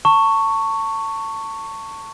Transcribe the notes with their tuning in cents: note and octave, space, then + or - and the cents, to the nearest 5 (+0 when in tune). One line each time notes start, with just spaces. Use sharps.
A5 +30 C#6 +0